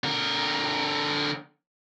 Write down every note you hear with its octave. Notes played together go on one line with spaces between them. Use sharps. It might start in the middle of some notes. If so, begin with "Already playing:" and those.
D3 A#4